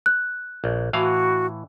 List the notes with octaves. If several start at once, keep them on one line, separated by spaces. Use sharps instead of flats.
F#6
A#1
A2 E3 F#4 F5